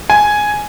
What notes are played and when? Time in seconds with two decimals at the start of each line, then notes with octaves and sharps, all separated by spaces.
0.10 G#5